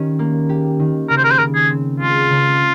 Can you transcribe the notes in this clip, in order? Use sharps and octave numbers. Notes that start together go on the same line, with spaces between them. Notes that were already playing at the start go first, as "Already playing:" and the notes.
Already playing: D#3 C#4 G4
A#3
G4
D#3
C#3 A#4
C5
A#4
C5
C#3 A#4
G#4
C4
G#3 F4
C#3